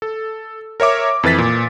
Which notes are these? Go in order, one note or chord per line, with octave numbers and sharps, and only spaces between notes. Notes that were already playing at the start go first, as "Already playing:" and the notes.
A4
A#4 C#5 E5 D6
F2 E3 B4 A6 B6
A#2